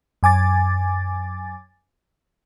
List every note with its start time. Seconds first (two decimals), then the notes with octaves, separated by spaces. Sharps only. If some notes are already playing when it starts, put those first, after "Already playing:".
0.23 F#2 G#5 D6 A6